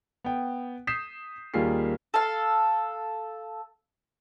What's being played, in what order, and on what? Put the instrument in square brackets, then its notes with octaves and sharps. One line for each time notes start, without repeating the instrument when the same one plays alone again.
[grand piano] B3 G5
D#6 G6 B6 C7 E7
D#2 G3 A#3 F4 G#4 C7
[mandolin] A4 F5